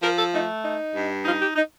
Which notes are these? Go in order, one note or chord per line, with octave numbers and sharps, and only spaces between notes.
F3 A#4
A4
A3 D#4
D#4
G2
D#4 F4
G4
D#4